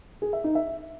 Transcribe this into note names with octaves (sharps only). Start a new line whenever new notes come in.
G#4
E5
D#4
E5